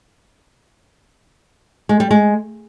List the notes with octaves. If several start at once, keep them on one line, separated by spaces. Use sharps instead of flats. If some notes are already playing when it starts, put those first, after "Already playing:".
G#3
G3
G#3